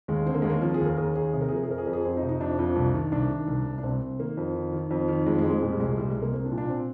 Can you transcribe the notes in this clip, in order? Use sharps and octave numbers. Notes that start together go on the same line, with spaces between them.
D#2 G#3
D3 C4
A#3
D#2 G#3
A#3
F3 C4
G#4
D#2
A#4
D#2 G#4
D#2 G#4
C3 G#4
A#4
G#4
F3 A#4
G#4
F2 A#4
G#4
F2 A#4
G#4
F2 C4
D#4
C3
D#4
F2 D4
F2
C2
D#3
C2 D4
D#3
C2
C2
D4
C2 C4
C2
D#3 A#3
F2
D#3
D#3
F2
D#3
F2 G#3
G#3
F2
G#3
A#2 G#3
G3
C2 G#3
C2 G3
G#3
C2
A#3
C2 C4
D4
A#2
D4
C4